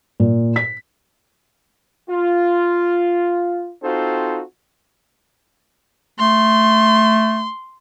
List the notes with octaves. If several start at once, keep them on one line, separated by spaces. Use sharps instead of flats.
A#2
B6
F4
C4 D#4 F4 F#4 A4 C5
A3 C6